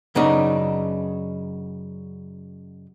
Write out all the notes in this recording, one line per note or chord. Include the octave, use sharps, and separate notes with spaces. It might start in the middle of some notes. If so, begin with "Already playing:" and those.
F#2 C#3 B3 D4 D#4